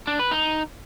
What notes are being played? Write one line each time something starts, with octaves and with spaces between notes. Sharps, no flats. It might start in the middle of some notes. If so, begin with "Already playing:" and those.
D4
B4
D#4